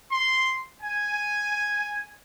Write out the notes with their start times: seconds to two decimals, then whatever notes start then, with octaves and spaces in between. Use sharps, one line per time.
0.12 C6
0.82 G#5